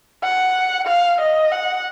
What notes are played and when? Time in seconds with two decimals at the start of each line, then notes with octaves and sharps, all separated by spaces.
0.23 F#5
0.87 F5
1.21 D#5
1.52 F#5